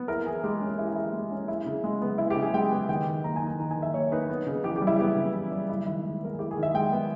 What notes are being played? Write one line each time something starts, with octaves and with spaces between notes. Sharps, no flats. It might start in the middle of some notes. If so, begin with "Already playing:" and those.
Already playing: B3
E4 A#4
E3 G#4
G#3 G4
C#4
E4
G4
E3 E4
G#3
C#4
E4
C#3
G#3
B3
E4
G4
C#3
G#4
G#3 G5
B3
D#3 G5
D#3
A#3 A#5
G#5
D#4
A#5
D#3 A#5
G#5
D#3
E5
A#3 C#5
D#4 B4
B3
C#3
E3 G4
G4
G3
E4
B3 G4
C#3
E3
G3
E4
D#3 E4
G#3
B3 A#4
G#4
E4 G4
G#4
D#3
E5
G#3 G5
B3